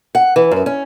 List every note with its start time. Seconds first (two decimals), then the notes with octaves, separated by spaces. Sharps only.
0.15 F#5
0.36 E3
0.51 F#2
0.66 C#4